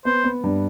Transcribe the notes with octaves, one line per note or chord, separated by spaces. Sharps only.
B3 C5
B3
G2